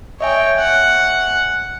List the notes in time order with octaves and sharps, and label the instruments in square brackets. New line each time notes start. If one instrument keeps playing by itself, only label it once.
[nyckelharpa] C#5 G5 [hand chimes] D#5 E5 G#5
[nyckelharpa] F#5